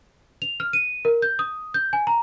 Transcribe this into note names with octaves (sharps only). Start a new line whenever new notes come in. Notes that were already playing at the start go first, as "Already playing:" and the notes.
F7
F6
D#7
A#4
G6
D#6
G6
G#5
A#5